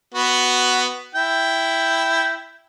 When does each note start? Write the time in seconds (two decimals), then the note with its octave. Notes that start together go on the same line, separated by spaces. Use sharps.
0.14 B3 F#4
1.15 E4 G5